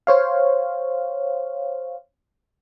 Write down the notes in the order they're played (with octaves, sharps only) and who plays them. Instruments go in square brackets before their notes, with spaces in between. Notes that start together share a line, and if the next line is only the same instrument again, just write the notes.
[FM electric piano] C5 C#5 F5